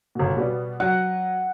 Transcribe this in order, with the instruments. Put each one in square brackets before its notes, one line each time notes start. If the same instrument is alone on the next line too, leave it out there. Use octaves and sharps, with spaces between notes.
[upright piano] G1 B2
B2 G3 B3
[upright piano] F#3 [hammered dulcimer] F#5